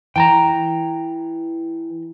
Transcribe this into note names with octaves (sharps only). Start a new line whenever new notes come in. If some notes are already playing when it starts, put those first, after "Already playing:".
E3 G5 A5 A#5